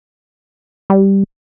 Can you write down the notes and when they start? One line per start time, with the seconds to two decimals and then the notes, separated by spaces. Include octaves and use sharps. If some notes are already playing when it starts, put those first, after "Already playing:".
0.90 G3